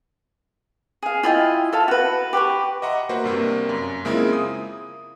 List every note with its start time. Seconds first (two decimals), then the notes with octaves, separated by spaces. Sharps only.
1.03 G#4 F5
1.23 E4 F4 D#5 G5
1.72 A4 E5 F5 A5
1.88 F#4 B4
2.33 G4 B4 G5 C#6
2.82 D#5 E5 F#5 A#5 C6 D6
3.09 A#3 F#4 B4 C5 F#5
3.24 G2 C3 A#3
3.69 F#2
4.05 C#3 G#3 A#3 C4 E4 F4
4.33 D#6